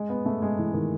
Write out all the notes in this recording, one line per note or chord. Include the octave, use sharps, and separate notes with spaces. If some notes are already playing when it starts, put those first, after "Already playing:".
Already playing: G#3
B3
A3
G#3
E3
D#3